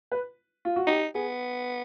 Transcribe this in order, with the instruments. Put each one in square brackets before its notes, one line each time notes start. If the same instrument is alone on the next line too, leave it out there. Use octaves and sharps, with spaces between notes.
[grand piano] B4
F4
F#4
[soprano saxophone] D#4 [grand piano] G4
[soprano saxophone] B3 [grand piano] G#4